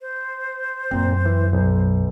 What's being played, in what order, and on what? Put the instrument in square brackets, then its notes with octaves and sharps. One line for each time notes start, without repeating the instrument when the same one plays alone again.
[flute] C5
[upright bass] F#2 [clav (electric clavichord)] A#2 C4
[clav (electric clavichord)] E3
B1